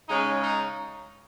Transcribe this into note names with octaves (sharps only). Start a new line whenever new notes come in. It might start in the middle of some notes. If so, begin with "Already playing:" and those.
C#3 G#3 C#4 D#4
D#4